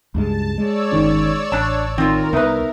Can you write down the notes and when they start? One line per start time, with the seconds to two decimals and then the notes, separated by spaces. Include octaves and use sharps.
0.14 C#2 G2 G#3 A5
0.58 G#3 C#5 D5 E6
0.92 G1 D#3 C#4
1.52 A1 D4 A5
1.98 D#3 C4 F4 A#4
2.33 C2 B3 D#4 B4 E5